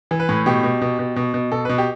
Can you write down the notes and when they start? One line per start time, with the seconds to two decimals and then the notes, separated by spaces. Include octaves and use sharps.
0.11 E3
0.19 B4
0.29 A2
0.46 B2 G4
0.63 B2
0.81 B2
0.99 B2
1.16 B2
1.34 B2
1.52 B2 A4
1.65 B4
1.69 B2
1.78 G4